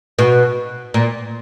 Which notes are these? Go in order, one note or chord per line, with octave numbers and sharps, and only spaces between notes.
B2
A#2